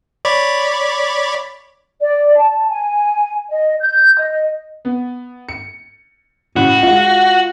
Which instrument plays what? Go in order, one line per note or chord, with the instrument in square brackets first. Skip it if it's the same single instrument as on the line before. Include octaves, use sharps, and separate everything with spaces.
[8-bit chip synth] C#5 D5 B5
[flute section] D5
A5
G#5
D#5
G6
D#5
[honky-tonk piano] B3
C#7
[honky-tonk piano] A2 C#3 [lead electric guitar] F#4
[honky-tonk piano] G#3 F4